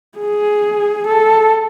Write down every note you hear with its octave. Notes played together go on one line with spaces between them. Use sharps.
G#4
A4